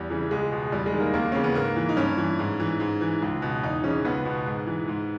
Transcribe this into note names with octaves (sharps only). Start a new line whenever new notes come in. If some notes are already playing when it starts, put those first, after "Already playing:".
Already playing: E2 G3
C#3 E3
C#2 G#3
B2
E2 G3
G#3
D#3
A#3
D#2 A#3
C#3 E3 C#4
B3
G#2 A#3
E3
D#4
G2 C#4
E3
G#2
E3
G#2
E3
C#2
B2
E2 D#4
C#3 E3 C#4
C#2 B3
B2
G#2
E3
G#2